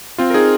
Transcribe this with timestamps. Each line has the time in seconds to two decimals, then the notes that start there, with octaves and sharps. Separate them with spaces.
0.18 C4 F4
0.30 A#4
0.34 D#4 G#4